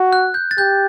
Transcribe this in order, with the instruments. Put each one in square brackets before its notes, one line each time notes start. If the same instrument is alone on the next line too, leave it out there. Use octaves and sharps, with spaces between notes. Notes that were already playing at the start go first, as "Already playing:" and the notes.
Already playing: [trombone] F#4
[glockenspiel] F#6
G6
A6
[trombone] G4 [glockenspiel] G6